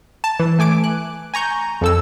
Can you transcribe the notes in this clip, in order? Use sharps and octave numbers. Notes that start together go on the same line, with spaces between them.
A5
E3
A3 G#5 D6 D7
F#6
G#5 A#5 C#6 G6
F2 A4 E6